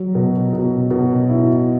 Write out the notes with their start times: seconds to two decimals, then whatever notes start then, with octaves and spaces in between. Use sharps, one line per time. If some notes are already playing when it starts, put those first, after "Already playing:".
Already playing: F#3
0.15 B2
0.53 B2
0.91 B2
1.30 E4